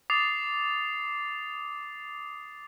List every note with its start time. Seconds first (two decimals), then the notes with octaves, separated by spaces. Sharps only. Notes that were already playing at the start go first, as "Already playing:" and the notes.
0.10 D6 D#6 A6 C7 F7